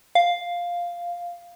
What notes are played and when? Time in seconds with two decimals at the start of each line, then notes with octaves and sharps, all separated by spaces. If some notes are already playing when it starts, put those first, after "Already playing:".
0.15 F5